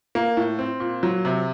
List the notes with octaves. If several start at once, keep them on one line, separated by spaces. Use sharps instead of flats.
A#3
A2
C4
A#2
F#3
C3